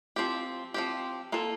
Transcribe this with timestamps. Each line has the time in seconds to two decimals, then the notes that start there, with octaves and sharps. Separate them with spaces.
0.16 F3 C4 G4
0.74 F3 C4 G4
1.32 A#3 F4 A4